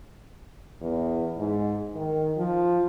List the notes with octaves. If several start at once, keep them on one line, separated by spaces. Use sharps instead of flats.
E2
G#2
D#3
F3